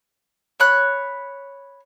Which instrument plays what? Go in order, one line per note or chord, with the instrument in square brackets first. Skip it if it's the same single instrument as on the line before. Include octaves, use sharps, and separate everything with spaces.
[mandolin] C#5 B5 F#6